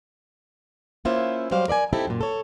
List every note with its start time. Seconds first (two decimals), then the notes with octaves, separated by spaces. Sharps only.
1.05 A#3 C#4 E4 F4 C5 E5
1.51 F#3 G3 C5 F5
1.68 A#4 D5 E5 G#5
1.93 C4 D#4 E4 G4 A4
2.07 F#2 A#2
2.21 A4 C#5